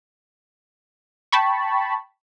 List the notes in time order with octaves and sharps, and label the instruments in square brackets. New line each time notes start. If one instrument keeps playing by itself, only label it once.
[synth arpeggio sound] G5 A5 B5 C#6